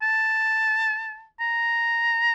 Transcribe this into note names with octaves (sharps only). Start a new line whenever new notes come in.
A5
A#5